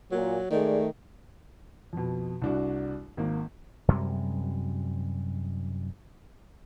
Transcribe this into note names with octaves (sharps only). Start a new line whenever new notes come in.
A#2 F#3
D#3 G#3 A3 G#4 D5
F2 B2
C2 D4 F#4
G#1 A#3
F#2 C3 G3 G#3